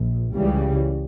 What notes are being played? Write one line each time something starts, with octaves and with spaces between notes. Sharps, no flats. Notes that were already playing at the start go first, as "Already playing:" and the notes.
Already playing: A#1
C#2 C#3 E3 G3